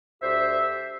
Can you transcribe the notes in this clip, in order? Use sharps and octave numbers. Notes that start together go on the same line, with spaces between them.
D2 G4 C5 E5